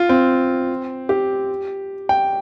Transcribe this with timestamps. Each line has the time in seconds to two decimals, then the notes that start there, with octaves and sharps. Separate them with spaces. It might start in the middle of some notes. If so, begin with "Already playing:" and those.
Already playing: F4
0.09 C4
1.09 G4
2.09 G5